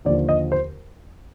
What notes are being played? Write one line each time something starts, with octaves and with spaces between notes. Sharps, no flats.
D#2 D3 F3 D5
D#5
C5